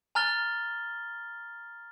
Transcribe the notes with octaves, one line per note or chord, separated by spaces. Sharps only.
G#5 A#5 F6 A6 G7